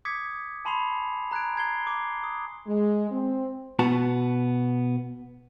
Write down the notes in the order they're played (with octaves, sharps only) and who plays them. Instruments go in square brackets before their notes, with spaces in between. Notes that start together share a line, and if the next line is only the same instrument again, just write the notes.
[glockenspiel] D6 D#6 G#6 B6 C#7
G#5 A5 B5 C6 C7 F7
A#5 F#6 G#6 D7
G#5 A#5 G#6 C7 G7
D6 C7
D#6
[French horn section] G#3
C4
[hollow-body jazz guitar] B2 B3 F#4 A5